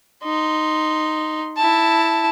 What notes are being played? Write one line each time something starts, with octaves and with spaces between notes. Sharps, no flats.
D#4 C6
E4 A5